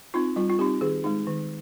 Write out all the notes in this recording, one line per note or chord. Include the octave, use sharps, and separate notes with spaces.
C4 D#4 F4
G3 F4
F4
C4 D#4 G4
D#3 G#4
G#3 D#4
D#3